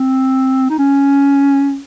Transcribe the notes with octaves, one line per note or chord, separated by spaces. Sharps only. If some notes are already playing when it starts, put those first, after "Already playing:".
Already playing: C4
D#4
C#4